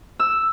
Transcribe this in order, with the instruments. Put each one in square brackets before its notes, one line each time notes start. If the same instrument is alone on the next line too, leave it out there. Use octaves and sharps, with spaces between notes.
[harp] E6